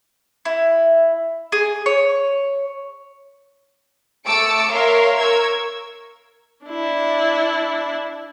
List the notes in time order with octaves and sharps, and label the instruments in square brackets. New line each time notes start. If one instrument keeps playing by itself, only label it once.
[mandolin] E4
G#4
C#5
[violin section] A3 A5 D6 E6 C#7 D7
A#4 C#5 E5 F5 A#5 C6
A#4 C#6 E6 G#6
[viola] D4 E4